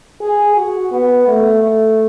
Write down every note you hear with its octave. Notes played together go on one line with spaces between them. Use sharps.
G#4
F#4
B3
A3
A3